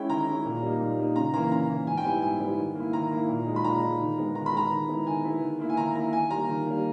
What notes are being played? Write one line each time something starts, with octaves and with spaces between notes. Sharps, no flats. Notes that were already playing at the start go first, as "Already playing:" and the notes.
Already playing: G#3 C#4 E4 G5
D#3 A#5
G#3 C#4 E4
A#2
G3 A#3 D#4
A#2
G3 A#3 D#4
C#3 A#5
E3 A#3 A#5
C#3 A#5
E3 A#3
G#2 G#5
G5
G3 B3 E4 G#5
G#2 G#5
G3 B3 E4
D#3
A#3 E4
D#3 A#5
A#3 E4
A#2
G#3 D#4
B5
A#2 A#5
G#3 D#4
D#3
G#3 B3
D#3 A#5
B5
G#3 B3 A#5
D#3
G#3 B3 E4
D#3 G#5
G#3 B3 E4
D#3
A#3 E4
G#5
D#3 A#5
A#3 E4 A#5
D#3 G#5
G3 A#3 A#5
D#3
G3 A#3